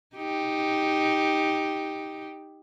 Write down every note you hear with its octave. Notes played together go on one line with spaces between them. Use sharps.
D#4 G4